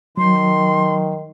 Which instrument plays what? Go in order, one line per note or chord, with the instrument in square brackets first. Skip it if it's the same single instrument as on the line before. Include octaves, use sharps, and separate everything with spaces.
[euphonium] D#3 [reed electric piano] F#3 [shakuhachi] C6